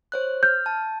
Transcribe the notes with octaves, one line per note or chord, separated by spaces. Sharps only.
C5 C#5 F#6
F6 G6
A5